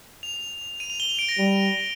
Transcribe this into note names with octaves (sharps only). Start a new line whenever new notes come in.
F7
D#7
F7
G7
F7
D7
A#6
G3